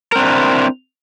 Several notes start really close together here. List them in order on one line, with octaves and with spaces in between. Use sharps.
A#4 C4 D4 E4